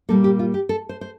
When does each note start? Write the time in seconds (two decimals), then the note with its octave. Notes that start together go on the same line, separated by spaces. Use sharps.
0.09 A#2 G3 A#3 A4
0.24 G4
0.39 F4
0.54 G4
0.69 A4
0.89 C5
1.01 C5